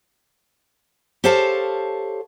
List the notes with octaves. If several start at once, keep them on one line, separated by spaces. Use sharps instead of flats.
G4 A4 C5 C#5 F5 A5